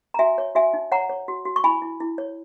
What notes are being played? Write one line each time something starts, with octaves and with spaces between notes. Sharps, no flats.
A#5
F#4 E5 G#5
C#5
F#4 E5 G#5
D#4
C#5 F#5 A#5
C#5
F#4
F#4
C#6
E4 G#5 B5
E4
E4
C#5